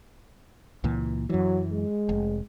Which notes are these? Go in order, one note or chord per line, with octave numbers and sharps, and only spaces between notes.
C#2 A#2 E3
F#2 E3 F#3
G#3
F1